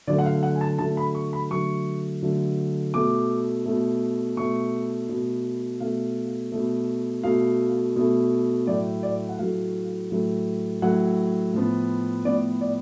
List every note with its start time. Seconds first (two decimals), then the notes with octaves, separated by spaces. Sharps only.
0.08 D3 F#3 A3 D5
0.19 F#5
0.25 F5
0.43 F#5
0.56 G#5
0.61 A5
0.78 D3 F#3 A3 A5
0.97 B5
1.15 C#6
1.33 B5
1.51 D3 F#3 A3 C#6
2.23 D3 F#3 A3
2.94 B2 A3 D6
3.66 B2 A3
4.37 B2 A3 C#6
5.09 B2 A3
5.80 B2 A3 F5
6.52 B2 A3
7.23 B2 A3 F5
7.96 B2 A3
8.67 A2 F#3 A3 D5
9.03 D5
9.29 F#5
9.39 A2 F#3 A3 F5
10.11 A2 F#3 A3
10.82 A2 F#3 A3 F#5
11.53 A2 F3 B3
12.25 A2 F3 B3 D5
12.61 D5